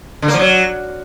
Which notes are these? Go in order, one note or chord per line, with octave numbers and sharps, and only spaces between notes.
D3
A#3
F3
F#3